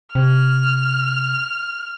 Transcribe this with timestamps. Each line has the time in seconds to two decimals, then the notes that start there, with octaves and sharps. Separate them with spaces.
0.15 C3 F6